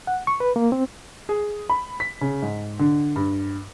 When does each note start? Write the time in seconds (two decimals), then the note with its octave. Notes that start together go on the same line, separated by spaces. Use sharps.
0.07 F#5
0.27 C#6
0.40 B4
0.56 A#3
0.72 C4
1.29 G#4
1.70 B5
2.00 B6
2.21 C#3
2.42 G#2
2.79 D3
3.16 G2